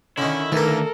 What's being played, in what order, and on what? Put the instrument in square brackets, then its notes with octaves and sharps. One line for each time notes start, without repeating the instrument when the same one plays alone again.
[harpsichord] D3 D#3 [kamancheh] C#4 [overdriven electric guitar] E4
[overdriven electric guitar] D2 [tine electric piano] D#3 [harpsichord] E3 A#3 [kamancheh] A4 A#4